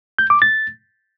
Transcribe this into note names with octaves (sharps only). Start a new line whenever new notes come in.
G6
D6
A6